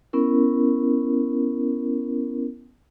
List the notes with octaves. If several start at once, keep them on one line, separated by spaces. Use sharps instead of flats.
B3 C#4 E4 A#4